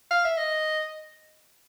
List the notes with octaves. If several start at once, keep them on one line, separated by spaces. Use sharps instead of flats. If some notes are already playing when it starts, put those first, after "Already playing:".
F5
E5
D#5